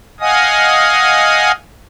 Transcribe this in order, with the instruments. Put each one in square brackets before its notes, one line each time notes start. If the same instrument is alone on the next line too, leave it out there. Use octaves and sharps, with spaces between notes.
[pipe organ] D#5 F5 F#5 G#5 D#6